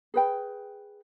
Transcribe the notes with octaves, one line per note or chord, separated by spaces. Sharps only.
G#4 B4 G5